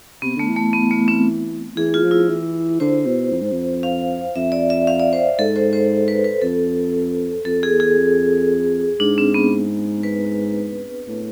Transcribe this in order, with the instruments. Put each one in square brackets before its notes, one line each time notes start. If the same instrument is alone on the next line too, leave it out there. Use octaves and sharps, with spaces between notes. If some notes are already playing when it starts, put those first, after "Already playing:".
[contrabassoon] C3 [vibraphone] B3
[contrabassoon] D3 [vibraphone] A3
[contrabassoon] E3
[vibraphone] A3
B3
A3
C4
[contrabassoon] E3 [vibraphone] G#4
[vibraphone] F4
[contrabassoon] F3
[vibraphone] E4
[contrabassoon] E3
[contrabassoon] D3 [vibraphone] C5
[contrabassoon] B2
F2
G#2
F2
[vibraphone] F5
[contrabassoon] F2 [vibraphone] E5
[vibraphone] D5
E5
F5
D5
C5
[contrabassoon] G#2 [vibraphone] A4
[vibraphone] C5
C5
B4
B4
[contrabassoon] F2 [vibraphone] A4
[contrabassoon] F2 [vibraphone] A4
[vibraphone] G#4
[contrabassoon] E2
[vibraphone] G#4
[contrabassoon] F2
[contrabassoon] G#2 [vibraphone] D4
[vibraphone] C4
B3
B4
[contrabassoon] A2